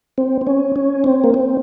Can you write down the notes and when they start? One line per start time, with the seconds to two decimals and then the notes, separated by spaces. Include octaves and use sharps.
0.18 C4
0.41 C4
0.47 C#4
0.76 C#4
1.04 C4
1.24 A#3
1.34 C4